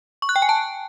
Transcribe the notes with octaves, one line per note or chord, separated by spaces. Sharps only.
C#6
F#6
G5
G#5
A5